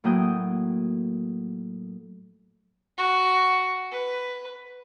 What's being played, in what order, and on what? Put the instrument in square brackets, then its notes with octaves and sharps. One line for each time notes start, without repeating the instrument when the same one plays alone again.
[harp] A2 F#3 A#3 G5 D#6 G6
[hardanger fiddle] F#4
B4